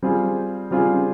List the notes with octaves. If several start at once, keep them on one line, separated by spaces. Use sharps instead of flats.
G3 C4 F4 G#4
G3 C4 F4 G#4